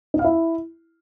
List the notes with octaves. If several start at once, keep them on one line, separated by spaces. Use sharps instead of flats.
D#4
F5
E4